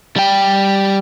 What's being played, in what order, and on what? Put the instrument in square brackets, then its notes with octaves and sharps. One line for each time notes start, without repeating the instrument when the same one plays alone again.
[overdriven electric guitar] G3 G5